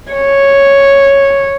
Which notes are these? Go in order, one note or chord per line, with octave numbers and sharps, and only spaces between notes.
C#5